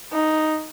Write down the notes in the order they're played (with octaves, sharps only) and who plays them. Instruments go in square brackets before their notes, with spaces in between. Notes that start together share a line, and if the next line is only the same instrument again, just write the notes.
[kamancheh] D#4